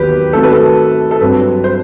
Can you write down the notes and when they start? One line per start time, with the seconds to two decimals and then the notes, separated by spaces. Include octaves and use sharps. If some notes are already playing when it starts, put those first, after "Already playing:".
Already playing: D#2 D#3 F#3 B3 G4 B4
0.33 D#3 A3 C4 F#4 A4
0.43 B4
0.52 A4
1.11 A4
1.21 G2 F#3 C4 B4
1.64 C5